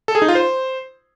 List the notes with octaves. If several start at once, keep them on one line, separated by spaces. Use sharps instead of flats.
A4
G#4
D#4
F4
C5